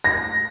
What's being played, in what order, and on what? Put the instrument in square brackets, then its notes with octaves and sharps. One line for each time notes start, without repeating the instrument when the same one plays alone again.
[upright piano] A#6